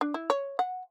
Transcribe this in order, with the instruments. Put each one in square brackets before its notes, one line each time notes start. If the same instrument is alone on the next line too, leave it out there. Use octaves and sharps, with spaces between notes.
[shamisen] D4
E4
C#5
F#5